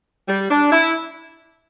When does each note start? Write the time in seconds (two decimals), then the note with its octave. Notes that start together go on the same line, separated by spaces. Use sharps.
0.28 G3
0.50 D4
0.73 E4